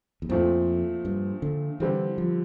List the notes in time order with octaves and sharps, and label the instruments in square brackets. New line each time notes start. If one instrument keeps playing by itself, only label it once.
[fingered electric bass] E2
[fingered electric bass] F2 [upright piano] A#2 F3 A3 C4
[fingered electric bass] G2
D3
[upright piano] D3 G3 C4 [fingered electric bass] E3
[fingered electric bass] F3